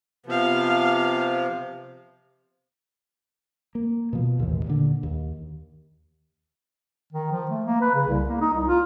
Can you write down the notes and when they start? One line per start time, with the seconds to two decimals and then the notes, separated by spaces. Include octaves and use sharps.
0.26 C3 F3 B3 F5
3.75 A#3
4.13 B2 F3
4.39 A1 D#2
4.67 A#2 D3
5.03 D#2
7.12 D#3
7.31 F3
7.50 A3
7.66 A#3
7.81 B4
7.94 C#3
8.08 C2
8.29 A#3
8.41 D#4
8.54 C2
8.67 F4